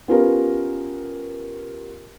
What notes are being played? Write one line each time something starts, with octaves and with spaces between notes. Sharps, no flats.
B3 C#4 F4 G4 A#4 B4